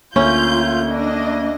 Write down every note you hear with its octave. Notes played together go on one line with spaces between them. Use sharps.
D2 A#3 C#4 F4 G6
D4 D#5